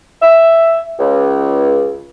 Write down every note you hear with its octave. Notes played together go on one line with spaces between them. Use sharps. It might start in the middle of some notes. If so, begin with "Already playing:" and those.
E5
C#2